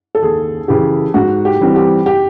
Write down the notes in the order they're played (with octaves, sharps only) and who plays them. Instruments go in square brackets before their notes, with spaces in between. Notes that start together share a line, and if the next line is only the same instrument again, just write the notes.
[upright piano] A4
[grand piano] D#2 [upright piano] G#4
[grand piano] C#3 E3 [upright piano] G4
[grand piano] G#2 [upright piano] F#4
[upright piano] G4
[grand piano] E3 G3 C4
[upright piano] G4
G4